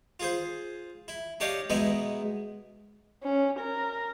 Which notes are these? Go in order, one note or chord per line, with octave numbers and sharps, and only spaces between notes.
F4 G#4 C5
E4
D4 G4 C#5 D#5 F5
B2 G#3 B3 D#4 E4
C#4
A#4